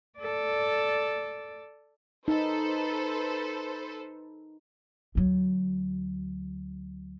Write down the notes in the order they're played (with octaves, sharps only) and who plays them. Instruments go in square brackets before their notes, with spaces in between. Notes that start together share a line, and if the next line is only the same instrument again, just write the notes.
[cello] A4 D5
[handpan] D#4 [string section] A4 B4 C5
[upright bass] D2 F#3